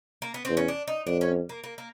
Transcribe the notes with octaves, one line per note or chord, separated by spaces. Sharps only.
A#3
B3
E2 C4
C#4
D4
D#4
F2 D4
C#4
A#3
A#3
A#3